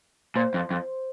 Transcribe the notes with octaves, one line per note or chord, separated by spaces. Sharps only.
A#2 C5
F2
F2